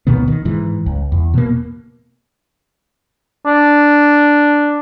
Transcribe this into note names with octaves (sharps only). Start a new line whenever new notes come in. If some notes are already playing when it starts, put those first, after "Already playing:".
C#2 B2 D#3 B3
D#3
G#2 E3
C#2
E2
B2 A#3
D4